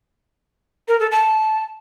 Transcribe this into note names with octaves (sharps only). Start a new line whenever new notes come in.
A#4
A4
A5